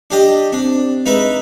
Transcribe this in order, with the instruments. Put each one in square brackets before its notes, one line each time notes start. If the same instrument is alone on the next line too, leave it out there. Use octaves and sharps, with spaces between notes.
[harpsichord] D4 G4 D#5
[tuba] C4 [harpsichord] D4
[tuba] G#3 [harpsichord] D#4 B4 E5